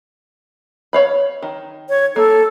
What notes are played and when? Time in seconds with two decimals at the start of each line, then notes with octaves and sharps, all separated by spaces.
0.93 C#5 F5 B5
1.42 D#3
1.89 C#5
2.16 A#3 A4